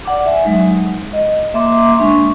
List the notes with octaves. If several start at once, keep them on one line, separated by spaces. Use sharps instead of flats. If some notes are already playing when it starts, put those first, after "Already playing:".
D5 F#5 D6
E5 G#5
F#3 G#3 D#4
D#5
A#3 E5 A#5 C6 D6
G#3 D4 E5 C#6